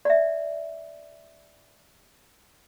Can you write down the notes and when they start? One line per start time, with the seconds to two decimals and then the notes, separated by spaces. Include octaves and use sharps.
0.05 D5 E5